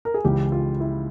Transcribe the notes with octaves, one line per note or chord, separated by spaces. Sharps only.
A#4
G#4
C#2 C#3 E3 G4
F4
E4